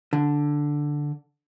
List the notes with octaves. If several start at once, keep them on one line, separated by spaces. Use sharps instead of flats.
D3